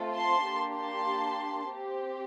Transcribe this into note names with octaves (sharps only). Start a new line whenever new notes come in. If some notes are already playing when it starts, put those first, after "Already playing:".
Already playing: A3 C4 F4 A4
A5 C6
A#3 D4 G4
A5 C6
C4 G4